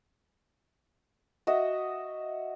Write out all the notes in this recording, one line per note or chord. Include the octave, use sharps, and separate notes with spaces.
F#4 D#5 E5